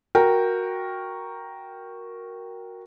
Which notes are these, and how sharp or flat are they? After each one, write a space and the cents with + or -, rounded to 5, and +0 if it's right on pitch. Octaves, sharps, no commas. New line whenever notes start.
F#4 -10 A#4 +0 G5 +0